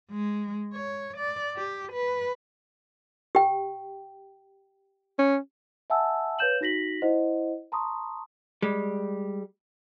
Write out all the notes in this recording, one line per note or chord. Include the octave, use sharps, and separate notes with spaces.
G#3
C#5
D5
G4
B4
G4 G5
C#4
E5 F#5 G#5 A5 E6
B4 C#5 F5 G6 E7 F#7
D#4 F#4 A#6 B6 F#7
E4 C5 D#5 F#5
A5 A#5 C6 C#6 D#6
G3 G#3